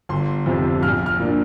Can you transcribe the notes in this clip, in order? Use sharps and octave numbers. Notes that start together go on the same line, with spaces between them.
G1 C6
F2 C3 F3 C4
A#1 F6
F6
A#2 A#3 D4